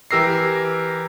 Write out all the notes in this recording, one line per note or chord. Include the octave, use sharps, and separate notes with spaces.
E3 G4 A#4 E6 A#6 C7